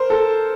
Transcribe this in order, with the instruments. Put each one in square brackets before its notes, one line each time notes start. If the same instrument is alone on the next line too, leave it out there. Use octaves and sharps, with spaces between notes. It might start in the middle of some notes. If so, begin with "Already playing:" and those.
Already playing: [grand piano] A#4 C5
A4